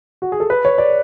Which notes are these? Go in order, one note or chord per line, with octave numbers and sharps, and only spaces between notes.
F#4
G#4
A4
B4
C#5
D5